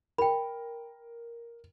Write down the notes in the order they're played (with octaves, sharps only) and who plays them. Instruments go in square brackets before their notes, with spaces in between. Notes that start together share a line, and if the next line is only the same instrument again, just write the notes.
[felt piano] A#4 [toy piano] G5 B5